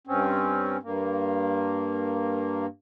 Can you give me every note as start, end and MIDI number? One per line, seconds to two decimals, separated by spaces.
0.07 0.77 43
0.07 0.77 60
0.07 0.77 61
0.83 2.66 43
0.83 2.66 58